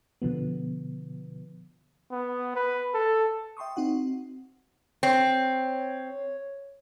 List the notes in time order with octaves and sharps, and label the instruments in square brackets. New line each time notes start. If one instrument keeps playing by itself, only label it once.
[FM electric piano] B2 D3 F3 B3
[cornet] B3
B4
A4
[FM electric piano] E5 G5 C6 C#6 D#6
C4 D#4 F#4 F#5
[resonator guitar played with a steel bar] C4 [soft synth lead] C#5